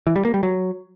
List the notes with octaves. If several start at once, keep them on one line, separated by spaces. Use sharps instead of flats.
E3
G3
A#3
G3
F#3